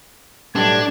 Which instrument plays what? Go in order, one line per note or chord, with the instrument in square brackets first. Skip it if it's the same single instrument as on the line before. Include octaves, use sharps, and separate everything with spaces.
[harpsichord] B1 A2 [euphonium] G3 [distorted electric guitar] D4 [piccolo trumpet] G#6